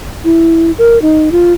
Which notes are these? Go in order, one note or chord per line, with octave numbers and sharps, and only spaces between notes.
E4
A#4
D#4
F4